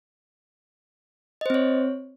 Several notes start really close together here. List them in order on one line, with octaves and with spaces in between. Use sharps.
D#5 C5 C4 C#5